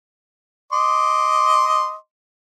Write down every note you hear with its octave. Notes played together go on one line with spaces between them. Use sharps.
D#5 C6 D6